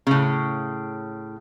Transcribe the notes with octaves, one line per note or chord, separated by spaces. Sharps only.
A2 C#3